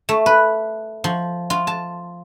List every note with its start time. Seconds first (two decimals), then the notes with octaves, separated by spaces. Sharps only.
0.09 A3
0.26 B4
1.04 F3
1.50 F4
1.67 A5